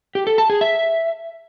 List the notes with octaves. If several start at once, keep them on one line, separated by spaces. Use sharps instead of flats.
G4
A4
A5
G#4
E5